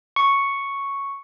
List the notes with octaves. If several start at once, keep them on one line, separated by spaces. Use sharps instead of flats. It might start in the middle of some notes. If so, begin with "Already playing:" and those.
C#6 C#7